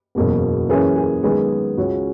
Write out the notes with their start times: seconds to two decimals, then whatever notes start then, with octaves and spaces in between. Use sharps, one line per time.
0.15 F#1 E2 B2 F#3 A#3
0.69 F#2 E3 A#3 C#4 G#4 B4
0.96 G#4
1.23 F#2 D#3 G#3 B3 G#4
1.77 C#2 C#3 G#3 C#4 F#4